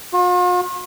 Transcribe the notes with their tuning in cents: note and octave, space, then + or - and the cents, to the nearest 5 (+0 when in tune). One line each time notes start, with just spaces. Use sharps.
F4 +45